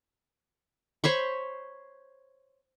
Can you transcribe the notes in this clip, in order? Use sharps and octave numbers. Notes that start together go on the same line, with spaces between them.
C5 C#5 B5 C#6